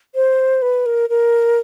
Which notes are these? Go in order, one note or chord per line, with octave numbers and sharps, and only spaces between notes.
C5
B4
A#4
A#4